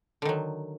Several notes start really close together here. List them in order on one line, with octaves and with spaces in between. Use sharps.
D3 D#3 F#3